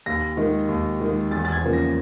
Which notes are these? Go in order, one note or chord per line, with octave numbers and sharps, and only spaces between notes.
D#2 A#6
D#3 G#3
D#2
D#3 G#3
E2 A6
A6
G#6
C#3 F3 A#3
A#6